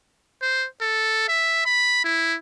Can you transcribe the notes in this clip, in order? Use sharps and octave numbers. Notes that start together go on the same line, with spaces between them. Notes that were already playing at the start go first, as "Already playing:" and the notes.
C5
A4
E5
B5
E4